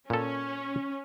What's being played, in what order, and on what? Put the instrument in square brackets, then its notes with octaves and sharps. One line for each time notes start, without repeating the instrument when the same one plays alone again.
[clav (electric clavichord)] A#2 A4 [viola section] C#4